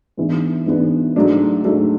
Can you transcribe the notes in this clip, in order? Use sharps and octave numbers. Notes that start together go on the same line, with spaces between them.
G#2 E3 B3 D4
G#2 E3 B3 D4
G#2 F#3 A3 D4
G#2 F#3 A3 D4